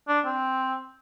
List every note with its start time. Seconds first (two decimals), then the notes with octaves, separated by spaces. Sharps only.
0.08 D4
0.26 C4